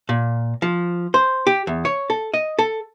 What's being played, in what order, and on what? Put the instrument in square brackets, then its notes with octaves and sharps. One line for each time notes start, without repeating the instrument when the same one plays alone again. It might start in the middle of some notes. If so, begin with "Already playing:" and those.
[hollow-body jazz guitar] A#2
F3
C5
G4
E2
C#5
A4
D#5
A4